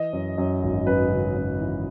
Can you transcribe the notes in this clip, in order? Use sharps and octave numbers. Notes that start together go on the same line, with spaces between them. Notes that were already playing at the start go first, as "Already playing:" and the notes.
Already playing: E3 D#5
F#2
F#2
G#1
F#2 B4
C#3
F#2
E3